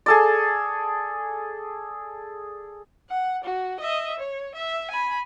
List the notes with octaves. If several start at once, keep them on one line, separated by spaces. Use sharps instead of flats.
G#4 A4 D5
F#5
F#4
D#5 E5
C#5
E5
G#5 B5